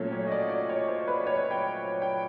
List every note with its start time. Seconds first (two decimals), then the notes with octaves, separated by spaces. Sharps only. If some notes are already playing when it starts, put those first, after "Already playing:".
Already playing: A#2 F#3 A3 C#4 C#5
0.12 C#5
0.27 D#5
0.32 D5
0.50 D5
0.69 C#5
0.88 C5
1.08 B4
1.27 C#5
1.51 G5
2.02 G5